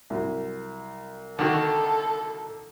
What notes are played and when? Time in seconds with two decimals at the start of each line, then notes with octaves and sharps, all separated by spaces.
0.10 C2 F#3
1.39 D3 D#3 F#4 A4